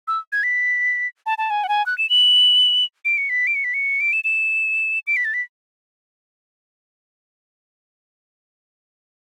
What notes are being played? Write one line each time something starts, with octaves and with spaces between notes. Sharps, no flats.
E6
G#6
B6
A5
A5
G#5
F#5
G#5
F#6
E7
F#7
D7
C#7
B6
D7
C#7
B6
C#7
D7
E7
E7
D7
B6
A6
B6